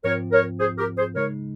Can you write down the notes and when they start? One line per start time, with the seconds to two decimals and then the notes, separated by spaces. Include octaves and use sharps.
0.04 G#2 F3 C4 F4 A#4 C#5
0.32 A#4 C#5
0.59 G#4 C5
0.78 G4 A#4
0.97 G#4 C5
1.15 C#3 G#3 D#4 A#4 C#5